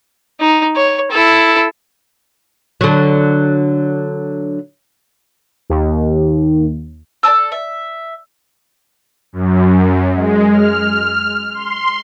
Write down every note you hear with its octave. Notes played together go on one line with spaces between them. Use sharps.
D#4
C#5
E4 A4
D3 F#3
D#2
A4 D5 A5 E6
E5
F#2
G#3
F6
C6